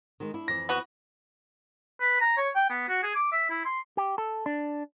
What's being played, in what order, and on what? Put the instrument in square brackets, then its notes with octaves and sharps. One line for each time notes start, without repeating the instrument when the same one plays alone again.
[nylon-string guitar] D#3 G#3
D4 E4
[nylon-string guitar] F2 E3 D5 [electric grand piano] A#6
[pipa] B3 F#4
[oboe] B4
A#5
C#5
G5
B3
F#4
G#4
D6
E5
E4
C6
[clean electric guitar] G4
A4
D4